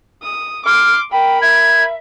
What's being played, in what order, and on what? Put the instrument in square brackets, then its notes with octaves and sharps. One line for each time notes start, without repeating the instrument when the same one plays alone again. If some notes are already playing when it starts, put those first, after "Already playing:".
[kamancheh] D#6
[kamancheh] C6 D6 [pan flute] F6
[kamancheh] A#4 B5 [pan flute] G5
[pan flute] E5 [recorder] G#6